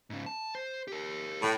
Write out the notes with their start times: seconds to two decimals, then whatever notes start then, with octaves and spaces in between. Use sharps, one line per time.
0.10 G#2 C#3
0.26 A5
0.55 C5
0.88 G4 A#4
1.42 B1 A2 G5